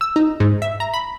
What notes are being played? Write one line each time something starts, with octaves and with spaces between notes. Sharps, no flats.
E6
D#4
G#2
E5
A#5
B5